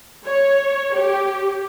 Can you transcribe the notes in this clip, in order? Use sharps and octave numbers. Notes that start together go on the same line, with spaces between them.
C#5
G4